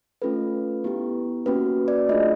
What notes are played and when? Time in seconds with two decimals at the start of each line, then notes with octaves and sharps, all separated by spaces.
0.22 A3 C#4 F4 A4 B4
0.84 B3 E4 G4
1.46 A#3 C#4 F#4 B4
1.88 D5
2.09 A3 D4 F4 G#4 D#5